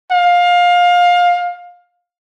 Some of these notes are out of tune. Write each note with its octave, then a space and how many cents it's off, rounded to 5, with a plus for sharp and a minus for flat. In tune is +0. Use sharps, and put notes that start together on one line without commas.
F5 +20